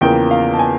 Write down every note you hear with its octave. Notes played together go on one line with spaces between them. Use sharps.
E2 C#3 F3 A#3 G5
F5
A5
G#5